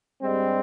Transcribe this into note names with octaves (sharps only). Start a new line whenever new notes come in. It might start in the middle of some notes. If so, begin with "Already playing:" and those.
G2 G3 G#3 C4